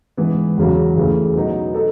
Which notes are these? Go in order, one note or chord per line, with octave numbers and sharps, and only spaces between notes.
G#2 E3 B3
E2 C#3 F#3
E2 C#3 E3 A3
B2 F#3 B3 D#4
D#4 A4